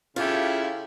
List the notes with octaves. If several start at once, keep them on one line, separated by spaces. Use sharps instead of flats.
C#3 E4 F4 G4 A4